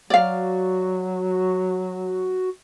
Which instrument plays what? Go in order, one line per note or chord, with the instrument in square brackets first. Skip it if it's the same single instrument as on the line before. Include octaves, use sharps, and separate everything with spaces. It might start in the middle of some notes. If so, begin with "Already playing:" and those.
[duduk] F#3 [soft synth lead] F#4 [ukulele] D5 F5